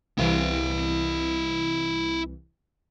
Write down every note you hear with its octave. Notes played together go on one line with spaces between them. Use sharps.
C2 E3 E4 F5